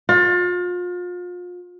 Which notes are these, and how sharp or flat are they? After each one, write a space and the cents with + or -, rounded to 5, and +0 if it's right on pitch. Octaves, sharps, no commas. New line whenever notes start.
F4 +35